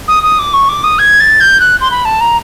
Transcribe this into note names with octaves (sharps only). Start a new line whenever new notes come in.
D#6
D#6
D6
C#6
D6
D#6
G#6
A6
G6
F#6
C6
B5
A5
A#5